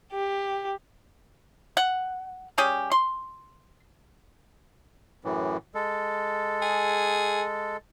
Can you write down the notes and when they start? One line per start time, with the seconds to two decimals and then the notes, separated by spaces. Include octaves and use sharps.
0.12 G4
1.77 F#5
2.58 G3 C#4 G4 G#4
2.92 C6
5.25 F#2 A2 E3
5.75 G#3 A4
6.62 G#4